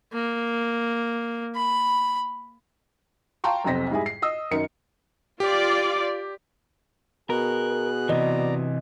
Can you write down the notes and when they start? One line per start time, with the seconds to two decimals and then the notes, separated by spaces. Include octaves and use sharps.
0.13 A#3
1.55 B5
3.44 F5 G5 A5 A#5 C6 C#6
3.64 B1 F2 C3 C5 A#6 B6
3.90 G#2 G3 E4 G#4
4.06 C7
4.22 D#5 D#6 E6
4.51 F#2 D#3 D#4 A#4 C#7
5.40 F4 G4 D5
7.30 B2 G#4 A#4 F#6
8.09 C3 E3 D5 D#5 A#5